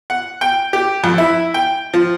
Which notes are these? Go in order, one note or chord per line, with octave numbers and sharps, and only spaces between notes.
F#5
G5
G4
F2
E4
G5
F3